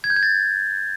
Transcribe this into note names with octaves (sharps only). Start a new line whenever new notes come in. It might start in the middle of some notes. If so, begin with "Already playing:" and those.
G#6
G6
G#6
A6